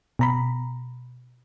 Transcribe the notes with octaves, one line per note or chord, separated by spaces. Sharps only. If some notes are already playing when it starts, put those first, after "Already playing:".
B2 A#5 B5